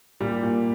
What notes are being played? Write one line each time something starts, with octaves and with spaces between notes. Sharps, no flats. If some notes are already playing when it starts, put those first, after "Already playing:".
A#2 G3 G4
A#2